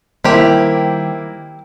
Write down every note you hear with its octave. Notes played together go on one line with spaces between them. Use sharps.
D#3 G3 A#3 C4 E4 G4